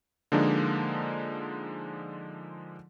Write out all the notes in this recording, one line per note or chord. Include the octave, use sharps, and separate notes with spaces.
D3 F3 G#3 A#3 D4 D#4